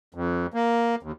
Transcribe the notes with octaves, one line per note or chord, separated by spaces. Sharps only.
F2
A#3
D#2